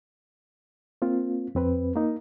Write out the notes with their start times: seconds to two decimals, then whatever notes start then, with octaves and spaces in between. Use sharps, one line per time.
1.02 A#3 C4 F4
1.55 F2 C4 B4
1.96 A#3 D#4